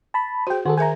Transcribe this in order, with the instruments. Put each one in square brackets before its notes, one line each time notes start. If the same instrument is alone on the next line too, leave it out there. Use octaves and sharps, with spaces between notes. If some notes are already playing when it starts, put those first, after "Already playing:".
[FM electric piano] A5 B5
[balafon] F#4 G#4 [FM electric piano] C5 G5
[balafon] D#3 [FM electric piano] F#4 G#4 A4
[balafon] G#4 A#4 E5 [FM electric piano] G#5 A#5